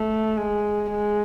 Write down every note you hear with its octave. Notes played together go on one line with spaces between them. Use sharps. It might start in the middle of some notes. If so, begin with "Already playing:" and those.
Already playing: A3
G#3
G#3